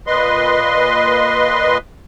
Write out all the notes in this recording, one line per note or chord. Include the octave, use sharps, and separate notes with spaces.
A#2 B4 D#5 C6